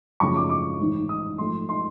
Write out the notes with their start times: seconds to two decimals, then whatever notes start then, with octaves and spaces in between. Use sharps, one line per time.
0.20 F#2 C#3 F3 A3 C#6
0.36 D6
0.49 D6
0.80 A1 G#2 D#3
1.09 D#6
1.38 G#2 F3 A3 C6
1.69 C6